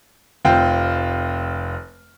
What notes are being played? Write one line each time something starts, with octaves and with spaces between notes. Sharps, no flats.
F1 C4 F4 G5